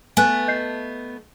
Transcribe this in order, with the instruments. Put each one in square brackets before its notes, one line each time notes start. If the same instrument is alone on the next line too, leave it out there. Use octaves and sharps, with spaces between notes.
[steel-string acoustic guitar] A3 B3 [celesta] G#5 F#6
[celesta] D#5 G6 C7